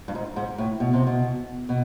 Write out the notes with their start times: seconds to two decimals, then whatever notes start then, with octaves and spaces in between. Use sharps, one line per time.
0.08 G2
0.15 G#2
0.36 G#2
0.58 A2
0.80 B2
0.93 C3
1.07 B2
1.69 B2